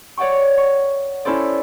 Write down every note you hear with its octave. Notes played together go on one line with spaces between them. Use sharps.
C#5 D5 F#5 G5 C#6
C#6
C#4 E4 A4 C5 D5